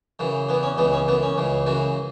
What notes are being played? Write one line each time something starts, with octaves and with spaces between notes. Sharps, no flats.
F#2 C#3 E3
E2 E3 B3
C#4
C#2 C#3 E3 B3
C#4
F#2 E3 B3
C#4
C#2 C#3 E3
F#2 C#3 E3 F#4